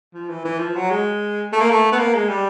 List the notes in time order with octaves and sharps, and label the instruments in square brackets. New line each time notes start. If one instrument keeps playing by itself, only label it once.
[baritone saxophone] F3
E3
E3
F3
F#3
G#3
A3
A#3
A3
B3
A#3
G#3
G3